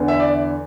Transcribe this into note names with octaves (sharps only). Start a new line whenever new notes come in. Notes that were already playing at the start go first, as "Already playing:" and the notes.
Already playing: E2 D3 B3
E5
D5